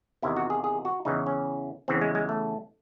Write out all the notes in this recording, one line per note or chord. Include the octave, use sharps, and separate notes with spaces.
E2 C3 D#3 E4
F#4
G#4
G#4
F#4
E2 C#3 E3 D#4
C#4
E2 C#3 E3 C4
G#3
G#3
A3